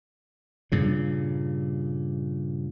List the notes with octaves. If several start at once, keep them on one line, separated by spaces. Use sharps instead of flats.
G2 A#2 C#3